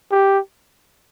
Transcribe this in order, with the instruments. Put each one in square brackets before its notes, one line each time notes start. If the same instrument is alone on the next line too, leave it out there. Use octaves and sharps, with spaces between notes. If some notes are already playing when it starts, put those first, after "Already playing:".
[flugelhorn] G4